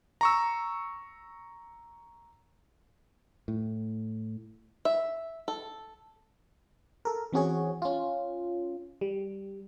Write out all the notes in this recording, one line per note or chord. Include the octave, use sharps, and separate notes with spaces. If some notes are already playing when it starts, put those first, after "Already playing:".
A#5 C#6 E6
A2
E5
A4
A4 A#4
E3 C4 C#4 F#4 G#4 C#5
C#4 F4
G3